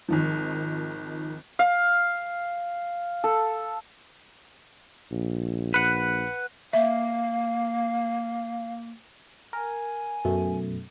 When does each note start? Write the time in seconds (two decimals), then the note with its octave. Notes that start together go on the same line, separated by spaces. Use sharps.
0.09 G#1 D#3 F3
1.59 F5
3.24 A4
5.12 A#1
5.74 B4 F#5
6.73 A#3 E5 F5
9.53 A#4 G#5
10.25 F#2 B2 A3